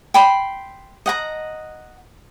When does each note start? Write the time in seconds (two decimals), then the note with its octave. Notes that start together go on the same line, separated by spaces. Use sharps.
0.14 G5 B5 C6
1.06 D#5 F#5 A#5